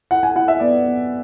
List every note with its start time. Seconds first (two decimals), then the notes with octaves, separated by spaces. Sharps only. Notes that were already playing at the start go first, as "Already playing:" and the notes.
0.11 E4 F#5
0.23 G#5
0.36 E4 F#5
0.48 E5
0.60 B3 D5
0.85 B3